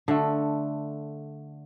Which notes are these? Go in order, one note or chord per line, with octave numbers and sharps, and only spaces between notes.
D3 A3